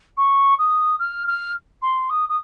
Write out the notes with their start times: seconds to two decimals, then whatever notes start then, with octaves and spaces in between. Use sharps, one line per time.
0.17 C#6
0.58 D#6
0.99 F6
1.27 F6
1.82 C6
2.10 D#6
2.29 D#6